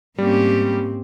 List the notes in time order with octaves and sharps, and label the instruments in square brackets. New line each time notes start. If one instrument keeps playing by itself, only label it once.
[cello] G#2 C4 [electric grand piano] G3 [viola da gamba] A#3 C#4 G4